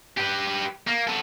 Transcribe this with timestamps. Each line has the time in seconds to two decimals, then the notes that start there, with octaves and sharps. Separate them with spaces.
0.17 G4 B4
0.87 A#3
1.07 B3 A4